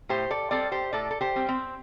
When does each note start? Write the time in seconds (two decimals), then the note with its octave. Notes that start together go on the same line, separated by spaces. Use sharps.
0.09 A2 G4 C5
0.30 A4 D5
0.51 G3 C4 A4 D5
0.72 G4 C5
0.93 A2 A4 D5
1.11 A4
1.21 G4 C5
1.35 G3 C4
1.48 C4